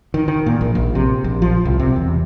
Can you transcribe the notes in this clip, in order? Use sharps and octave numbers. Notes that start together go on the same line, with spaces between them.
D#3
D#3
A#2
A#1
A#1
C3
A#1
F3
C2
C3
E2